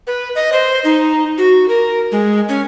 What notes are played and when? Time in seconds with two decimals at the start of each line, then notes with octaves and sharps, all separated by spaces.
0.07 B4
0.35 D#5
0.53 C5
0.84 D#4
1.38 F#4
1.68 A#4
2.12 G#3
2.49 C#4